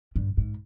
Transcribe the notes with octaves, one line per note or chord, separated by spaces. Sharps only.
G2
G#2